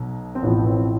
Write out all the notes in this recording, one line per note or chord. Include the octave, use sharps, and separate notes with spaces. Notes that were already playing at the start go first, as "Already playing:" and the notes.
Already playing: B1 B2
C4
A1 A2 F3 B3
C4